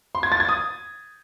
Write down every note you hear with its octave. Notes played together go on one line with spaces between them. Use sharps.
C6
G#6
A6
G#6
D#6